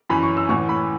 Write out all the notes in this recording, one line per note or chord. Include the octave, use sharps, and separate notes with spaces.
F#2 E3 C#4 B5
C#6
E6
A1 A2 E3 C#6
B5